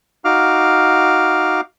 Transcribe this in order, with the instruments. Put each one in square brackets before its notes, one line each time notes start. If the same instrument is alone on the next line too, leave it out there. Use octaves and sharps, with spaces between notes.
[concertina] D#4 F#4 F5 D6 F6